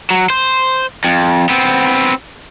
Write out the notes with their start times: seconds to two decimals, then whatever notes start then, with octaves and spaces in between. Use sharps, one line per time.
0.10 F#3
0.30 C5
1.04 F2
1.49 B3 C4